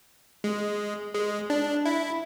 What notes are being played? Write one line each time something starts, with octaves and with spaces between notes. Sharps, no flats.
G#3
G#3
D4
E4